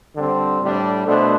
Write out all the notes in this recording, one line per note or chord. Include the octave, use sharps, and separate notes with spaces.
D3 G3 C4
A2 G3 D4
B2 A3 D4 A4 C5